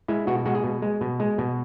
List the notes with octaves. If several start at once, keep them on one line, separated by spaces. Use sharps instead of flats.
G#3 E4
B2 F#4
G#3 F#4
G#4
B2
G#3
B2
G#3
B2